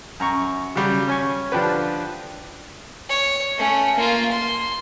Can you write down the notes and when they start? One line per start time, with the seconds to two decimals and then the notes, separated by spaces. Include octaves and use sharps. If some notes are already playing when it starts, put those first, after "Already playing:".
0.20 F#2 A#5 C#6
0.76 C#3 F#3 G3
1.08 C#4 G#5 C#6
1.52 D3 F3 D4 G4 B4
3.09 C#5
3.58 A3 C#4
3.96 A#3 F4
4.32 C6